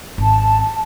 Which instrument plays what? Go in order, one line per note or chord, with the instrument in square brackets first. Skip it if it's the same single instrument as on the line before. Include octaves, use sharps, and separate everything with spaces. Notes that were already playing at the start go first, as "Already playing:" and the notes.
[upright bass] G#1 [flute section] A5